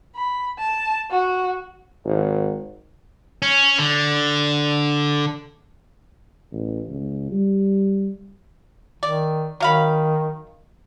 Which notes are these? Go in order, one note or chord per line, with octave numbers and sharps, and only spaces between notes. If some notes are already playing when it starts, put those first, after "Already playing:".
B5
A5
F#4
G#1
C#4
D3
A1
C#2
G3
D#3 D5
D#3 F#3 F5 B5